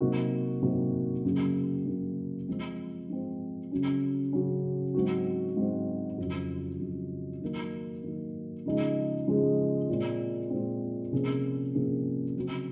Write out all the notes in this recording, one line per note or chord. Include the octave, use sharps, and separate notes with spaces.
C3 F#3 A#3 D#4 F#4
C3 F#3 A#3 D#4 F#4
F#2 C#3 F#3 A#3
F#2 C#3 F#3 A#3
F3 G#3 C4
F3 G#3 C4
C#3 F#3 C#4
C#3 F#3 C#4
G#2 F#3 C4 F#4
G#2 F#3 C4 F#4
F2 C#3 F#3
F2 C#3 F#3
D#3 F#3 A#3
D#3 F#3 A#3
C#3 F3 G#3 D#4 G#4
C#3 F3 G#3 D#4 G#4
A#2 G#3 C4
A#2 G#3 C4
C3 F3 A#3 C#4 G#4
C3 F3 A#3 C#4 G#4
C#3 F#3 C4 F#4